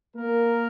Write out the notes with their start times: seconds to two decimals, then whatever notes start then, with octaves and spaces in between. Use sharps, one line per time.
0.15 A#3 A#4